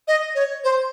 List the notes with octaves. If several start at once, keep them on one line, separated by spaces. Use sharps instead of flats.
D#5
C#5
C5